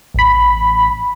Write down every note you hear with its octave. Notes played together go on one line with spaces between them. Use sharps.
A1 B5